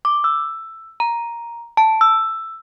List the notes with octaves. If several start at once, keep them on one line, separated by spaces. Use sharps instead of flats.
D6
E6
A#5
A5
E6